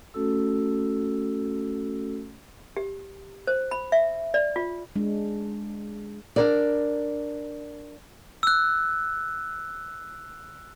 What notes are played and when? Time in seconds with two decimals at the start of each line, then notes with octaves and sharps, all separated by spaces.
0.14 A3 C#4 F#4 A4 E6
2.77 G4
3.47 C5
3.71 B5
3.92 E5
4.34 D5
4.56 F4
4.96 G#3 D4
6.36 D4 A#4 D5
8.43 E6 F#6